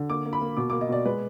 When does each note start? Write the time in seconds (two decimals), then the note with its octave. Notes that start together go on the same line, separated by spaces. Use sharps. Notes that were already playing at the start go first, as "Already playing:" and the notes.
Already playing: D3
0.10 A#3 D6
0.26 A#3
0.33 B5
0.41 A#3
0.57 B2 D6
0.70 A#3 D6
0.81 D#5
0.89 B2 D5
1.05 G#3 B4